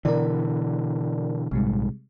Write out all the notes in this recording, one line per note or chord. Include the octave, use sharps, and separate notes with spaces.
B2 D3 E3 A#4 D5
A#1 G#2 C3 G3 G#3